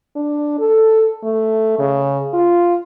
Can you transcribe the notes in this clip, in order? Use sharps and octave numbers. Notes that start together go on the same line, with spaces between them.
D4
A4
A3
C#3
F4